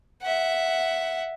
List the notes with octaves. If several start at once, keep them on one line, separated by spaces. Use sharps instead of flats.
E5 F#5